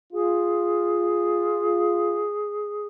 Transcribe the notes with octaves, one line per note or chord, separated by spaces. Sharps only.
F4 G#4